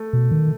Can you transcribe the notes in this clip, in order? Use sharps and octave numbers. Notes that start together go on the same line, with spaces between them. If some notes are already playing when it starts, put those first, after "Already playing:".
Already playing: A3
B2
D#3